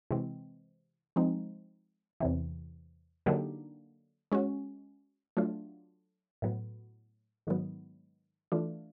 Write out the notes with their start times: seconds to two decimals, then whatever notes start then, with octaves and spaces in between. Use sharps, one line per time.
0.11 C3 E3 G#3 C4
1.16 F3 G#3 C4 D#4
2.20 E2 C3 E3
3.26 D3 F#3 A#3 D#4 G4
4.32 G#3 C#4 F#4
5.37 F#3 A3 D4 F4
6.42 A2 F#3 B3
7.47 G#2 D#3 F#3 B3
8.52 E3 A3 D4 F4